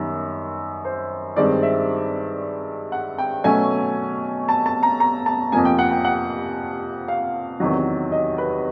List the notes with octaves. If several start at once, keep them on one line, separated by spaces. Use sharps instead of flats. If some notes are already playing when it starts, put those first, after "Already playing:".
Already playing: F#2 D#3 G3 B3
C5
G2 D#3 G#3 C4 D5
E5
F#5
G5
B2 F#3 A3 C#4 G#5
A5
A5
A#5
A#5
A5
F2 C3 F3 A#3 G#5
G5
F#5
G5
F#5
F5
E2 C3 D#3 F#3
D#5
B4